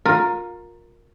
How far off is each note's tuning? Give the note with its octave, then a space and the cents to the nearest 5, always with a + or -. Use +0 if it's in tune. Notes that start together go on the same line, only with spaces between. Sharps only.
F4 +30 A#4 +0